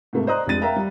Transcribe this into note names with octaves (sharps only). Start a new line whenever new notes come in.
G#2 C3 A3 A#3
C5 D5 D#5 A#5 D#6 F#6
F1 F2 G#3 D4 A6 D#7
A#4 E5 F5 G5 A#5
G3